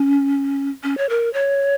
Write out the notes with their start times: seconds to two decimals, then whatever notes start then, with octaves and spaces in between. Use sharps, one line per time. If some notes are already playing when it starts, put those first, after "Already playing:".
Already playing: C#4
0.83 C#4
0.98 C#5
1.09 A#4
1.33 C#5